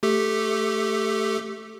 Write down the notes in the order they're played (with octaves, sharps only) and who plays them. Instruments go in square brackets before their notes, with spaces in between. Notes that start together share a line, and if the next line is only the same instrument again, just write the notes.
[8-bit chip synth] A3 G4 A4